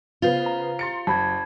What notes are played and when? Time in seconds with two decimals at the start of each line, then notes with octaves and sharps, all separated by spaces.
0.22 C#3 B3 F4 C5
0.46 A#5
0.79 C6 A6 C#7
1.07 F#1 A5 B5 G#6